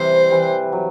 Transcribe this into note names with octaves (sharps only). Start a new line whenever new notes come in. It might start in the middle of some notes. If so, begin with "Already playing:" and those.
Already playing: C3 E3 G3 C5
E3 G3
F#3